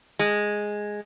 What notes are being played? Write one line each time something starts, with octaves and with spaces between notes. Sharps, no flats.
G#3